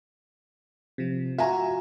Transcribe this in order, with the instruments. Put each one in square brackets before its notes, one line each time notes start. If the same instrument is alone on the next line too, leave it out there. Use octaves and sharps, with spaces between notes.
[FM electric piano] C3 F3
[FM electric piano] F4 F#4 [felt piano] E5 G#5 A#5